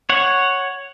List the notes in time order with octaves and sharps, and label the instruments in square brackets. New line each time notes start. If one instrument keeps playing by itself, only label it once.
[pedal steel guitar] C#5 F#5